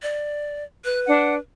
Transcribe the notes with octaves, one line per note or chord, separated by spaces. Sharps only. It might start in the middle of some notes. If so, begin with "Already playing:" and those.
D5
B4 F#6
D4 F#5